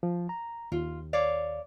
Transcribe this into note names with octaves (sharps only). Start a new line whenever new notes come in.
F3
A#5
D#2 F4
C#5 D5 F5